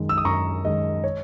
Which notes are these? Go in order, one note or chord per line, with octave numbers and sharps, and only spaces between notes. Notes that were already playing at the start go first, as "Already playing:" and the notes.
Already playing: F#2 D#3 G#3
E6
D#6
F#2 A#5 C#6
D#3 G#3 D#5
C#5